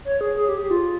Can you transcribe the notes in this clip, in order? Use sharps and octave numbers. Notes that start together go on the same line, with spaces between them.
C#5
G#4
G#4
G4
G4
F4